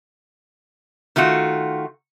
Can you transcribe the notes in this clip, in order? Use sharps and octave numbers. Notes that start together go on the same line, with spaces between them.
D#3 A3 F4 F#4